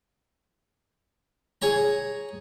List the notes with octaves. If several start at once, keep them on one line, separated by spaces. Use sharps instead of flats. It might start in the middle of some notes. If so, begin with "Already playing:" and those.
G#4 C#5 A#5